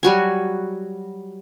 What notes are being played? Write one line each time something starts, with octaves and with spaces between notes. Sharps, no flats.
F#3 G3 F#4 G#5